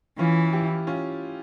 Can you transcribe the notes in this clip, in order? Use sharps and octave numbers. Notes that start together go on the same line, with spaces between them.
E3 C#4 F4
E4 G4
C#4 F4